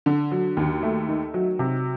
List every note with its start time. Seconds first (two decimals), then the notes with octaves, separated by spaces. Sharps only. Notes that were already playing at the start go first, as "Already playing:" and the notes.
0.06 D3
0.31 F#3
0.57 D#2
0.83 A3
1.09 D#3
1.34 F#3
1.59 C3